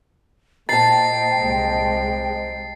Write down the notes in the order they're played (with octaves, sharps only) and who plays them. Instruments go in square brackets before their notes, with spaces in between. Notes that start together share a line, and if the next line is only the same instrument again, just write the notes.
[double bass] A#2 [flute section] C5 D#5 G5 [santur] A5 A#5 [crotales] A6 C7
[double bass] C2 G#3